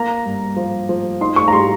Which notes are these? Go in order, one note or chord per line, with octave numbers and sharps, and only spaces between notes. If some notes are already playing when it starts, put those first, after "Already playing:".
Already playing: A#3 A#5
G2
F3
F3
D#4 C6
C#6
A#5
G3 C6